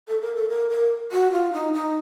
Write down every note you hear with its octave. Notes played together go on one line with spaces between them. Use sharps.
A4
A#4
A4
A#4
A#4
F#4
F4
D#4
D#4